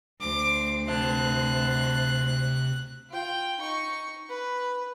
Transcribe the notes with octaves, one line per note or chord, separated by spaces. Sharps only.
D2 C5 D6
C3 A5 F#6
F4 G5
D#4 C#6
B4